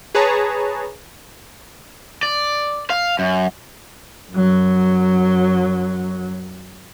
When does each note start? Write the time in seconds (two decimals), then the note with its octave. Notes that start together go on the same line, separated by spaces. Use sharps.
0.15 G#4 B4 C#5 A5 A#5
2.23 D5
2.90 F5
3.19 F#2
4.32 F#2 F#3